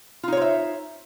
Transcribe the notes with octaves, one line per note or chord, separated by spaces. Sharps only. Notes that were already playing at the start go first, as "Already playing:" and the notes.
D#4 F4 C5 C#5 E5